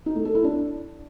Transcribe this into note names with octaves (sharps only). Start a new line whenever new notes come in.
D#4
A3
A4
E4
D4